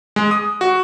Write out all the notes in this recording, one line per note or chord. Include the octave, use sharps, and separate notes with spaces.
G#3
D#6
F#4